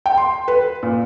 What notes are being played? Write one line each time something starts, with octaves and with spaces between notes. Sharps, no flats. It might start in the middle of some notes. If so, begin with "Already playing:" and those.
G5
C6
B4
A#2